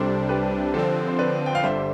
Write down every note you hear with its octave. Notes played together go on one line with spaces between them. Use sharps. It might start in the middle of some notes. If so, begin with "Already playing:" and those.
Already playing: C2 C3 G3 D4 A4 C5
G4 B4
D3 F3 C4 A4 C5
C5
B4 D5
G5
F5
G1 G2 D3 G3 C5 E5